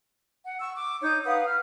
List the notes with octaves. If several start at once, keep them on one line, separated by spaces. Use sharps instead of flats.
F#5
C#6 E6
D6
D#4 C#5 G6
B4 F5 F#5 D#6
F6